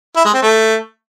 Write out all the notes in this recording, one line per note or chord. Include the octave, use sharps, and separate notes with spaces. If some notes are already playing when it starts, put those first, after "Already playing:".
E4
G#3
C4
A3